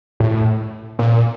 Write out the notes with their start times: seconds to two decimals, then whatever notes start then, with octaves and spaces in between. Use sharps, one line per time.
0.20 A2
0.99 A#2